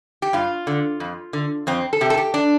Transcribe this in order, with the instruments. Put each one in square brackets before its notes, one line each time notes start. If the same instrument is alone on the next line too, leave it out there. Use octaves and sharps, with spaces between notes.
[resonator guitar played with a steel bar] G4
G2 F4
D3
F2
D3
F2 C4
A4
C3 G4
A4
G4
D4